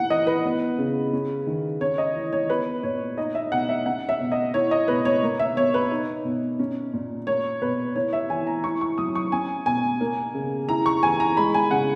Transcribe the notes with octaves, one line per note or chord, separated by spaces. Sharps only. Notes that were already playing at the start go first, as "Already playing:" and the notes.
Already playing: A#2 E4 F#5
E3 D#5
B4
B3
C#3
C#4
D#3
C#4 C#5
D#5
E3
C#5
B3 B4
A#2 C#5
D#4 D#5
E5
B2 F#5
E5
C#4 F#5
E5
B2
D#5
E4 C#5
D#5
B2 B4
C#5
A#3
E5
B2 C#5
B4
D#4
B2
C#4
A#2
A#3 C#5
B2 B4
E4 C#5
E5
E3 G#5
A#5
E4 C#6
C#6
F#3 D#6
C#6
C#4 G#5
B2 G#5
A#3
C#3
E4 A#5
C#6
E3 G#5
A#5
G#3 B5
G#5
C#3 F#5